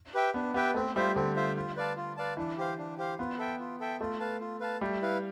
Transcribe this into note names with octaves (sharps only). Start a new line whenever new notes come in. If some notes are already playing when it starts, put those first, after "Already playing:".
G4 B4 E5 G5
B3 D4
B3 G4 B4 E5 G5
A3 C4
G3 F4 C5 E5
D3 C4
F4 C5 E5
F4
B4 D5 F5 A5
F4
B4 D5 F5 A5
E3 D4
G4 C5 F5
D4
G4 C5 F5
B3 F4
A4 E5 G5
F4
A4 E5 G5
A3 F4
B4 F5 A5
F4
B4 F5 A5
G3 A3
E4 B4 F5